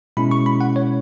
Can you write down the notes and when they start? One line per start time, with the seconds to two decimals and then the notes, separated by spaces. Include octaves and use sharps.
0.17 B2 G#3 C#4 E4 B5
0.31 C#6
0.46 B5
0.61 F#5
0.76 C#5